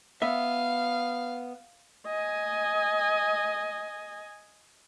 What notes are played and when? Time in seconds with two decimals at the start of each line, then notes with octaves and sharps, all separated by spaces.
0.22 B3 E5 F5
2.06 D#5 G#5